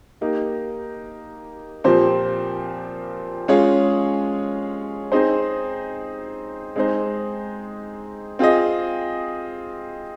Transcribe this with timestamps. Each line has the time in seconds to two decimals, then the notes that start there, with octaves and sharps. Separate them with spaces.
0.21 A#3 D#4 G4
1.84 A#2 F3 C4 G4 C5
3.48 G#3 C#4 F4 G#4 C#5
5.12 C4 D#4 G#4 C5
6.76 G#3 C4 D#4 G#4 C5
8.39 C4 F4 G#4 D#5